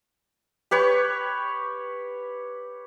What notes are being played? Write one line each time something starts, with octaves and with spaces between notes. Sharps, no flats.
G4 B4 C#5 C#6